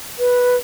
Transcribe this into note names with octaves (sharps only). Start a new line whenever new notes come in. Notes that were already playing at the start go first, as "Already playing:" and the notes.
B4